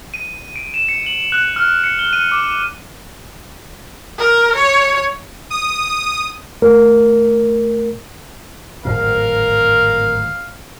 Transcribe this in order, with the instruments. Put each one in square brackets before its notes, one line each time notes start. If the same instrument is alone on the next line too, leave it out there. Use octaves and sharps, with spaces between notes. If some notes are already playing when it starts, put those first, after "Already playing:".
[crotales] D#7
D7
E7
C#7
F#7
F#6
F6
C#7
G7
D#7
D6
[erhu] A#4
C#5
[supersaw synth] D#6
[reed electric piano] D#2 A3 A#4
[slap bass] D1 G#1 A#2 [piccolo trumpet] A#4 [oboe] F5